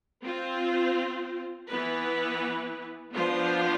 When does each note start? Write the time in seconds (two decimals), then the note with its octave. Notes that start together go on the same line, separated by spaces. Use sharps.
0.24 C4 F4 C5
1.68 E3 B3 E4 B4
3.12 F3 B3 D4 F4 C5